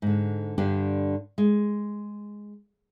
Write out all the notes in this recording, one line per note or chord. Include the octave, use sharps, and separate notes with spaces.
G#2 D3
G2 D3 D4 G4 D5
G#3